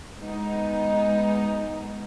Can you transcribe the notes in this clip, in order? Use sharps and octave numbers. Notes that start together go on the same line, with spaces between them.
G#3 B3 D#4